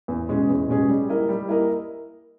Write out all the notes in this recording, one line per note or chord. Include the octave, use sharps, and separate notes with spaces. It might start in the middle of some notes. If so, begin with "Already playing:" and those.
E2
B2 G#3 C#4 G#4
E2
B2 G#3 C#4 G#4
G3
A#3 E4 A#4 D#5
G3
A#3 E4 A#4 D#5